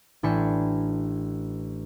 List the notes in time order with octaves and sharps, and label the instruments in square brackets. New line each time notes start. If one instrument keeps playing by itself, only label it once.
[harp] A1 D4 G5 G#5 B5 C#7